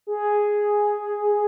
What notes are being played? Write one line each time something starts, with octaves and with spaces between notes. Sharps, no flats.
G#4